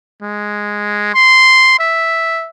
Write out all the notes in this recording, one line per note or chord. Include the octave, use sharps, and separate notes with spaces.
G#3
C6
E5